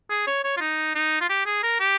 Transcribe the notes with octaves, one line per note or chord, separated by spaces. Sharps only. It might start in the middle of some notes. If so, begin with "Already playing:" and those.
G#4
C#5
C#5
F4
D#4
D#4
F4
G4
G#4
A#4
G4